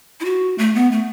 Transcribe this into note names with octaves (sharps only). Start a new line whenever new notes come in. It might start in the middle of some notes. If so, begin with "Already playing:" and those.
E4
F#4
A3
B3
A3